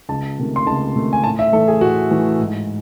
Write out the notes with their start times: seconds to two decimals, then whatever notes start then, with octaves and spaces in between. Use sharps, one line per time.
0.09 C#2 A5
0.39 C3 D#3 A3
0.56 C6
0.66 C#2 A5
0.95 C3 D#3 A3
1.13 G#5
1.24 A2 A5
1.39 E5
1.52 E3 A3 A4
1.68 G#4
1.81 A2 F#4
2.11 E3 A3
2.39 G#2